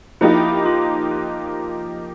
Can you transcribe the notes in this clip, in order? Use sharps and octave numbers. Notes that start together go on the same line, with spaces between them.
F3 A#3 D#4 E4 G4
F4
F4